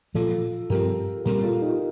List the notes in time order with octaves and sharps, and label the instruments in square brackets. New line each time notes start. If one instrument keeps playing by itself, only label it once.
[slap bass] A#2 F3 A#3 [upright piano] F4 A4
[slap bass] G2 F3 C4 [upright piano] G4 A#4
[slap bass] A#2 G3 C4 [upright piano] G4 A#4
[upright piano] F4 A4
D#4 G4